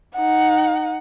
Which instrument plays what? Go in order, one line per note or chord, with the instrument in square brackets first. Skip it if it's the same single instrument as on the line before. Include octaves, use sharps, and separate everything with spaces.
[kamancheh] D#4 F#5